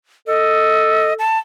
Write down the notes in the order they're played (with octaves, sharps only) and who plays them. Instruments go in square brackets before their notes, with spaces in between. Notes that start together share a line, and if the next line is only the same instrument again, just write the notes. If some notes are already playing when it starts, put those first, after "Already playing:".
[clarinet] A4 [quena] D#5
[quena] A5